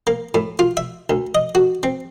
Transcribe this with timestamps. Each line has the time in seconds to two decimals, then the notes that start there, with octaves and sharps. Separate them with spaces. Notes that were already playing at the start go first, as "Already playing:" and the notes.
0.07 A#3
0.34 A2
0.59 F4
0.77 E5
1.10 D2
1.35 D#5
1.55 F#4
1.83 C4